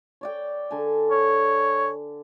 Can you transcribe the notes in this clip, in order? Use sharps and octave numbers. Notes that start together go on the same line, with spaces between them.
C#5 D5 G5
D3 A4 G#5
C#5